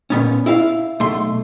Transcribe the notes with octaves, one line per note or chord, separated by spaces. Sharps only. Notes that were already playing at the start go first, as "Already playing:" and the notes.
A#2 B3 C#4
E4 E5 F5
B1 A3 C6